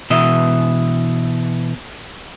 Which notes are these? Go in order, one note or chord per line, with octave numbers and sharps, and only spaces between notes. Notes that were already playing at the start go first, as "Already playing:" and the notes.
B2 E3 D#5 E5